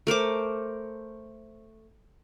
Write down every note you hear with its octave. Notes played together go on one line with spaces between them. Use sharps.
A3 A#4 C5 D6